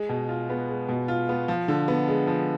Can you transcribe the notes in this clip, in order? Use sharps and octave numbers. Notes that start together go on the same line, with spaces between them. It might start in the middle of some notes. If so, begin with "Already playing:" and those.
Already playing: G#3
B2
F4
B3
G#3
B2
F4
B3
F3
D3
B3
G#3
F3